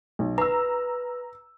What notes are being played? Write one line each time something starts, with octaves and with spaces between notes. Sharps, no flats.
B1
B4 A#5 E6